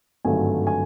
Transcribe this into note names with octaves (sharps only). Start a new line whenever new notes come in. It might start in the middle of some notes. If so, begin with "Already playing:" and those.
G#1 G2 D3 F#3 A3 G#5
G#5